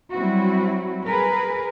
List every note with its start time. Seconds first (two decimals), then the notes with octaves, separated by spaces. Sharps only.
0.12 F#3 G3 C4 E4 F#4
1.06 G#4 A#4 B4